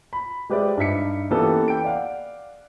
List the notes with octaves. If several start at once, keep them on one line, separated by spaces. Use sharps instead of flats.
B5
G#3 G4 B4 C5 D5 E5
G2 D#4 E5 B6 C#7
E3 A#3 B3 C#4 G4 A4
G5 D7
D5 F5 F#5